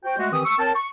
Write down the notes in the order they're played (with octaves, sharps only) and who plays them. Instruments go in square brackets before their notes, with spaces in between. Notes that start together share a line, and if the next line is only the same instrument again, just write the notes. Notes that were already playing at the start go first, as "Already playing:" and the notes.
[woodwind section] F#4 C5 G5
G#3 A3 F#4
D#3 E3 C4 G4 D#6
C#6 E6
C4 A#4 C#5 G5 A5
C#6